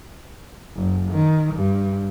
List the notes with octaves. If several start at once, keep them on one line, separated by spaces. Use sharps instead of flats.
F#1
D#3
G2